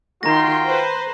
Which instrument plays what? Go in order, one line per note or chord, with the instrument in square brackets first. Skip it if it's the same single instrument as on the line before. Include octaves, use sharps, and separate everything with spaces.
[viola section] D#3 C6 [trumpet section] F4 F#4 G5 [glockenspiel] A#5 A#6
[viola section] B4 C5